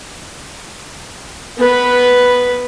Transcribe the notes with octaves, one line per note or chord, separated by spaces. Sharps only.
B3 B4